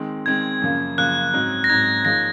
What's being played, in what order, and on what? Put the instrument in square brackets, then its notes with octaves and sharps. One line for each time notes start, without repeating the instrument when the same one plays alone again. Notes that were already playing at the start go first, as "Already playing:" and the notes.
Already playing: [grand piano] D#3 G#3 C4
[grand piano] D#3 G#3 C4 [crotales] G#6
[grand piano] F#2 C#3 F3 A#3
[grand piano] F#2 C#3 F3 A#3 [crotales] F#6
[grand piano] G#2 F#3 C4 D#4
[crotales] A#6
[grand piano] G#2 F#3 C4 D#4 [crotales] G#6
[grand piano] F3 A#3 D#4 G#4 C#5 [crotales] A#6